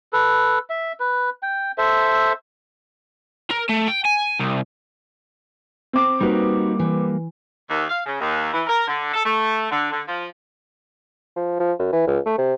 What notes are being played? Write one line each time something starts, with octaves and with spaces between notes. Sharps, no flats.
A4 B4
E5
B4
G5
A4 C5 E5
A#4
A3
G5
G#5
C2
C4 D6
G3 A#3 D#4 F#4 B4
E3
D#2
F5
C#3
D#2
E3
A#4
D3
A4
A3
D3
D3
F3
F3
F3
F#2
E3
C#2
A3
C3